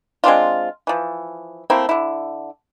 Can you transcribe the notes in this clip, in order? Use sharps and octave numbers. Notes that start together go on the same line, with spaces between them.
G#3 C4 D4 F4
E3 F3
A3 A#3 C4 E4
D3 E4